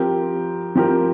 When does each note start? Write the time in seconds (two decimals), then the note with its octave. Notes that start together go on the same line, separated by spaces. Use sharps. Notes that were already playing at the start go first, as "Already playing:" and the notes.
Already playing: F3 C4 G4 A#4
0.75 F3 C4 G4 A#4